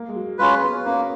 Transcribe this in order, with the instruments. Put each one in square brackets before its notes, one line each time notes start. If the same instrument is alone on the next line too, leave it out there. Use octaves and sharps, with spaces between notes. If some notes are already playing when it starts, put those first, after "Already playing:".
Already playing: [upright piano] A#3
G#3
F#3
[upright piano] G#3 [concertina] C#4 F4 B4
[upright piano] B3
[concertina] A#3 [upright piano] C#4